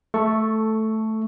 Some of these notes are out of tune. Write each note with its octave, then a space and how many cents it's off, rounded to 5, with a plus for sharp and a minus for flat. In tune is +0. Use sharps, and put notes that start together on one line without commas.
A3 -5 A4 +0 C#6 +0